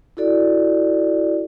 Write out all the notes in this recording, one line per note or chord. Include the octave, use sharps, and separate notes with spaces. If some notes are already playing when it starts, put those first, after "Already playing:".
E4 F#4 A4 D5